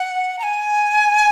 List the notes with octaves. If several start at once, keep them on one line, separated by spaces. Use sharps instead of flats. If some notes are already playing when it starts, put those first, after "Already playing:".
Already playing: F#5
A#5
G#5